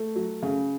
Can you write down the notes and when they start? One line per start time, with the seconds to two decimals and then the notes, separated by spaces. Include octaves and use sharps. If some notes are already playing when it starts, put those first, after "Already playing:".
Already playing: A3
0.16 F#3
0.42 C#3